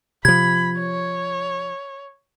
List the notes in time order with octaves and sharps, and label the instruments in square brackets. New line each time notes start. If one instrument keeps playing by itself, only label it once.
[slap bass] C3 F3 [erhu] B5 [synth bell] G#6
[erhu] C#5